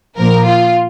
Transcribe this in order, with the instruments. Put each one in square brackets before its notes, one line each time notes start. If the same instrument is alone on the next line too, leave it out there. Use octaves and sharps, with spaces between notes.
[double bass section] A#2 F3 A#3 [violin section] A#4
[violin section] F4